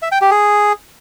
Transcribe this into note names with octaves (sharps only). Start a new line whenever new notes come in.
E5
G5
G4
G#4